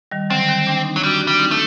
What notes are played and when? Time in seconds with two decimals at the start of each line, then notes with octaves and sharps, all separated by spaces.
0.12 D#3 G3
0.30 D3 F#3 C4
0.48 D#3 G3
0.67 A#3 D4
0.85 C4 D#4
0.96 F#3
1.03 G3 D4 F#4
1.21 D4 F#4
1.27 G3
1.39 C4 D#4
1.51 A3